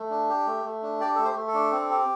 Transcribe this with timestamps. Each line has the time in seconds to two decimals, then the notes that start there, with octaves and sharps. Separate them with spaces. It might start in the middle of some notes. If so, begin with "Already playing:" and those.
Already playing: A3
0.10 D4
0.29 G4
0.47 A3
0.65 A3
0.83 D4
1.00 G4 D5
1.15 A3 A4
1.24 C5
1.35 A3
1.47 A4
1.54 D4
1.72 C4
1.90 G4